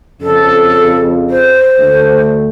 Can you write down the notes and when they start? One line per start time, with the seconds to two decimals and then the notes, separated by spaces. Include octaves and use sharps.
0.21 F2 C#3 A4
1.30 C5
1.79 D2 D3 A3